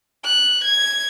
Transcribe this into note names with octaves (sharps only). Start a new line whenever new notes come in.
F#6
G#6